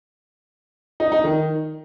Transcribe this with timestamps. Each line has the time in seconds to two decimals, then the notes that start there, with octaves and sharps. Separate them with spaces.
1.00 D#4
1.12 D#4
1.24 D#3